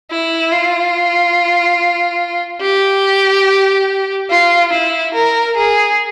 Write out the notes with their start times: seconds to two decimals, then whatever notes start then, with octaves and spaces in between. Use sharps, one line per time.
0.11 E4
0.52 F4
2.62 G4
4.30 F4
4.72 E4
5.14 A#4
5.56 G#4